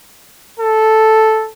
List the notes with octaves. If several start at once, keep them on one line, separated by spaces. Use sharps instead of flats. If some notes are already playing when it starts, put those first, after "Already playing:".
A4